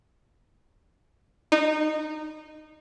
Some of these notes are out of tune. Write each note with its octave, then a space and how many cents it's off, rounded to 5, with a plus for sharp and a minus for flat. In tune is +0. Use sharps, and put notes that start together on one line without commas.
D#4 -20